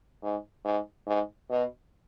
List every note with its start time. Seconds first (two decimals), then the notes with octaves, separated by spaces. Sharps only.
0.23 G#2
0.65 G#2
1.07 G#2
1.50 B2